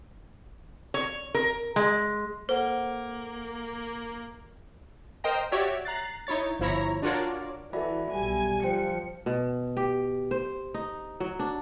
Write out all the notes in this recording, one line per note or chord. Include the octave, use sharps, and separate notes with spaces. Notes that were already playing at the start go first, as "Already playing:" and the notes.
C#5
A#4
G#3
A#3 A4 C5 F#5
A#4 C5 D#5 G5 A#5
F#4 G4 C#5 D5 E5
A#5 F#6 A6 C7
D#4 E4 C#5 A6
G1 F3 E4 C#5 A#5
D4 F4 F#4 A#4 C#5 D5
E3 F#4 A4 D5 E5 B5
B1 G3 G#5
F3 C5 G5 C#7
B2
G4
C5
D#4
F#3
D4